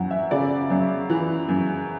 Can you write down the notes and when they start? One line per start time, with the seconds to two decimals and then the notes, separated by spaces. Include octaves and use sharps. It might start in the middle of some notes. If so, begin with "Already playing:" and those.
Already playing: F#2 E3 F#5
0.11 E5
0.31 C#3 D5
0.70 F#2
1.10 E3
1.49 F#2